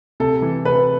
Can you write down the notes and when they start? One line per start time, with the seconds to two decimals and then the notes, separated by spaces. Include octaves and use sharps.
0.20 C3 A4
0.42 E3
0.65 C3 B4